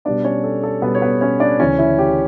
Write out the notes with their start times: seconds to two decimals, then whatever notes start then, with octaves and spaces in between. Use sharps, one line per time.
0.05 B2 G3 B3 D4 D5
0.24 C#4 C#5
0.44 A4
0.63 A4
0.82 B2 G3 B3 B4
0.95 C#5
1.02 B3 B4
1.21 C#4 C#5
1.40 D4 D5
1.60 D2 C#3 E3 C#4 C#5
1.79 E4 E5
1.99 G4